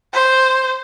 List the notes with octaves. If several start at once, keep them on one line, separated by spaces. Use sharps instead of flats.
C5